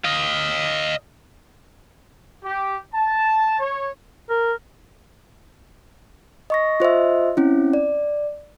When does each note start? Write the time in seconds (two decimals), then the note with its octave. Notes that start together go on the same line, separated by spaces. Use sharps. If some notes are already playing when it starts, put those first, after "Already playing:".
0.04 D#5 F5
2.44 G4
2.93 A5
3.59 C#5
4.29 A#4
6.50 D#5 C#6 A#6
6.80 F4 C5 D#5 E5
7.37 C4 C#4 E4
7.73 D5